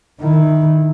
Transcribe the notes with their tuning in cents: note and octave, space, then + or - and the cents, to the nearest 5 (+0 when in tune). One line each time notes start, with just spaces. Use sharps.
D#3 -15 E4 -10